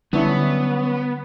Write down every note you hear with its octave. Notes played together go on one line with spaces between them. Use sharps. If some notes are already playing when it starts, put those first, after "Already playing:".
D3 F#3 G3 B3 C#4 D4 E4